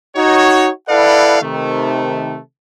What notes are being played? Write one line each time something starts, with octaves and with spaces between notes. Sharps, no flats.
D#4 F#4 C#5
E4 A4 B4 D5 F5 F#5
C3 D#3 A3